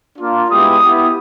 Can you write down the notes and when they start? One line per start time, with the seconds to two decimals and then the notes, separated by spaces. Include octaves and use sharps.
0.19 A#3 D4 F4
0.50 G#3 B3 E4 G4 D#6
0.83 B3 E4 G4